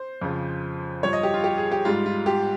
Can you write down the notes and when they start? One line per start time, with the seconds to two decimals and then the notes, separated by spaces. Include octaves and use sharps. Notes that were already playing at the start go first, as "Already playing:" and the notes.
Already playing: C5
0.22 F2 C#3 F3
1.03 G2 F3 C#5
1.13 D#5
1.23 G4
1.34 F4
1.44 G4
1.58 G#4
1.71 G4
1.85 G#2 G3 F4
2.06 F4
2.26 G4